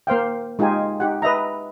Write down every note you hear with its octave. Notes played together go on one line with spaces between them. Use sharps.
A#3 C5 F5 G5
G#3 D#4 F4 G4 G#5
D#4 G4 F#5
B4 D#5 E5 A#5